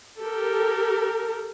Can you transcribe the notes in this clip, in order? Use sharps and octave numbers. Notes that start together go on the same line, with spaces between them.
G4 A4 A#4